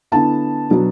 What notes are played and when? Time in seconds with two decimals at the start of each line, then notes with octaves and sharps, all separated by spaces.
0.12 D3 B3 E4 A5
0.70 B2 F#3 B3 D4